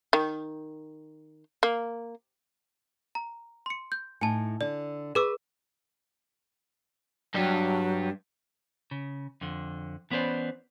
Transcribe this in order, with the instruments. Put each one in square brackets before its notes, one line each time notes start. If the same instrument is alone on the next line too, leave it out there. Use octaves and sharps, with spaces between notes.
[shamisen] D#3
A#3
[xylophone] A#5
C6 C#7
G6
[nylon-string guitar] A2 D#4 [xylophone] G#5 A5
[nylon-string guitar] D3 [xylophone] D5
[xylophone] G#4 D6 E6 [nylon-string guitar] B4
[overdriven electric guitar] G2 G3 [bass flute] F#3
[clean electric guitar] C#3
F2 D3
E3 B3 C#4 B4 C5 D5